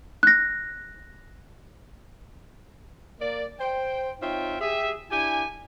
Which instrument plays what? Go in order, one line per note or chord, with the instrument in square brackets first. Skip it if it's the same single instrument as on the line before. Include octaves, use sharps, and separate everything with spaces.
[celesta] F#6 A#6
[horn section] A#3 D5
C5 G5
C4 D#4 F4 C#5 E5 G5
G4 G#4 E5
D4 E4 G4 G#5